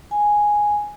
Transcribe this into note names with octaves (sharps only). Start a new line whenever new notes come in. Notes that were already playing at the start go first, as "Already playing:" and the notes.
G#5